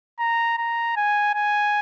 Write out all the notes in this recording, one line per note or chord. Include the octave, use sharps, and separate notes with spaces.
A#5
A#5
G#5
G#5